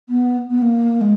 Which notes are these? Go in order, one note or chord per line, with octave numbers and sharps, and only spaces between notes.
B3
B3
A#3
G#3